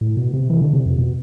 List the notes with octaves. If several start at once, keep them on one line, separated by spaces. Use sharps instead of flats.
A2
B2
C3
E3
D3
C3
F2
B2